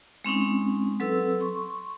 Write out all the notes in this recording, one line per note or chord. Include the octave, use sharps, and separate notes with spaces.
G#3 C4 C#4 D#4
F#3 C4 A4 B4 E6
C6 C#6